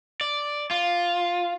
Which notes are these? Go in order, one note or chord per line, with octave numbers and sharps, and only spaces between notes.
D5
F4